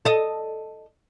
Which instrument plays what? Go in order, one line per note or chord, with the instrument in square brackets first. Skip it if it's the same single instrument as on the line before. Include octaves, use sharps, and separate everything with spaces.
[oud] A4 D#5